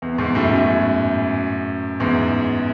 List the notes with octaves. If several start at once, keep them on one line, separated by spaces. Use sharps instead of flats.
E2
E2 G#2
F#2 A2
F#2 A2
E2 G#2